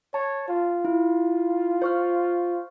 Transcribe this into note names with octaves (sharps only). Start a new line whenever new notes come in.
C#5 A5
F4
E4
C5 C#6 F6